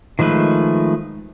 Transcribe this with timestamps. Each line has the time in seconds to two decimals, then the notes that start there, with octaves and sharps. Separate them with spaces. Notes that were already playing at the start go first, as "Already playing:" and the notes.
0.19 D#3 F3 G#3 A3 B4